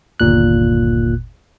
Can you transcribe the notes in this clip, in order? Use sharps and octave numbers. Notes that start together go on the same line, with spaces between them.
G1 D#2 A#2 F#6